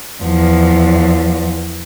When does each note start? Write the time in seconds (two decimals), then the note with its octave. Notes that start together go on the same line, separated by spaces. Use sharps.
0.23 E2 F3